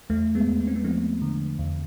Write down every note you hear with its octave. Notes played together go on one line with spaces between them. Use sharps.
E2 A3
G#3 B3
E2
B3
C4
G#3 B3
F3 A3 C4
D3
E2